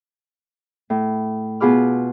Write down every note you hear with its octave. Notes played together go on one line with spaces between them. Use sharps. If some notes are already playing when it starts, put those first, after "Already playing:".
A2
B2 F4 G#4 B5 D6 F6